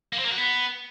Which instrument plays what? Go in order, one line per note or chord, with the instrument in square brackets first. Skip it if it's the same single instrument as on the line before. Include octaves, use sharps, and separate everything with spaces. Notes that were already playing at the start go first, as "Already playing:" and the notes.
[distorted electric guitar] A#3
C4
A#3
F#4
B3